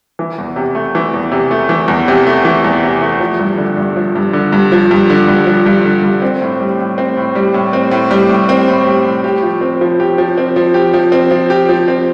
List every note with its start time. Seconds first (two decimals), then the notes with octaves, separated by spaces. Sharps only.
0.19 E3
0.38 E2
0.56 C3
0.75 A3
0.95 E3
1.14 E2
1.32 C3
1.51 A3
1.69 E3
1.88 E2
2.08 C3
2.27 A3
2.45 E3
2.64 E2
2.83 C3
3.01 A3
3.20 F3
3.39 G2
3.58 D3
3.77 G2
3.96 F3
4.15 G2
4.33 D3
4.52 G2
4.72 F3
4.91 G2
5.10 D3
5.28 G2
5.46 F3
5.66 G2
5.85 D3
6.03 G2
6.22 C4
6.42 A2
6.60 G3
6.79 A2
6.98 C4
7.17 A2
7.35 G3
7.54 A2
7.73 C4
7.91 A2
8.11 G3
8.29 A2
8.49 C4
8.68 A2
8.87 G3
9.06 A2
9.24 G4
9.43 F3
9.61 C4
9.81 F3
10.00 G4
10.18 F3
10.38 C4
10.56 F3
10.74 G4
10.94 F3
11.12 C4
11.31 F3
11.50 G4
11.69 F3
11.88 C4